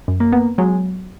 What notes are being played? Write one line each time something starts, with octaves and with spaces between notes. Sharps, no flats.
F#2
A#3
B3
F#3 G#3